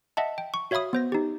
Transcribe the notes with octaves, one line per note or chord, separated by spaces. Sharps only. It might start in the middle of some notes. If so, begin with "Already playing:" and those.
D#5 E5 F#5 A5
G5
C#6
F#4 C#5 E5 F5 B5 D#6
B3 C5 A#6
D#4 G4